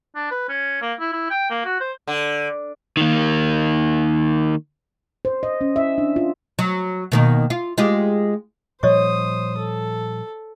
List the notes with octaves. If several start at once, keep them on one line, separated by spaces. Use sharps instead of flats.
D4
B4
C#4
A#3
E4
E4
G5
A#3
F#4
C5
D3
D#3 A#3
C5
D#5
C#4
E5
D4
F4
F#3
B2 D#3 A#3
F4
G#3 F4 G4
A#2 F3 G3 C5 C#5 D#5 C#6 D#6
A4